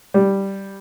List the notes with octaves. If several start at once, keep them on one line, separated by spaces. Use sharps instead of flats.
G3